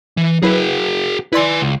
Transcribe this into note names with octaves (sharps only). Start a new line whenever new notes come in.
E3
F#3 E4 F#4 G#4 B4
E4 B4 D5 G#5 C6
C#2